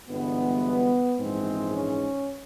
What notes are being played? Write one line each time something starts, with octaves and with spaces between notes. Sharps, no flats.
G1 G2 E3 G#3 B3
A#1 G#2 E3 G#3 C4
C#4